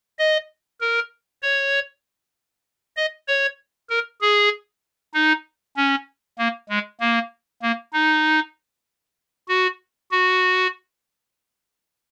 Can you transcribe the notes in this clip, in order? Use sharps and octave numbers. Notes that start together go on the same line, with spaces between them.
D#5
A#4
C#5
D#5
C#5
A#4
G#4
D#4
C#4
A#3
G#3
A#3
A#3
D#4
F#4
F#4